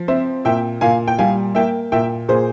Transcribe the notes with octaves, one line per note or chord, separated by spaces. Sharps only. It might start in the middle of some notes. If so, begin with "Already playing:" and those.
Already playing: F3
C4 C5 E5
A#2 E5 G5
A#2 F5 G#5
G5
G3 F5 G#5
A#3 E5 G5
A#2 E5 G5
A#2 G#4 C5